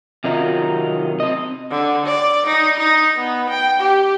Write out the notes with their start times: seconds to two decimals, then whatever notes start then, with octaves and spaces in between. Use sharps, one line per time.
0.24 C3 D#3 F#3 D#4 F4
1.20 C4 D#5
1.70 D3
2.06 D5
2.46 D#4
2.80 D#4
3.16 B3
3.50 G5
3.80 G4